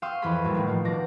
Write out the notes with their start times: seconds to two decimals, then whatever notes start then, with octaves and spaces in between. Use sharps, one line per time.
0.02 F5 G5 C6 C#6 D#6 E6
0.22 F2 E3 F4 G#4 B5 D#6
0.43 F#2 A2 G3 A#3
0.55 A2 D#3 A3
0.67 F3 A#3
0.85 D#1 B2 D#3 D5 D6 A#6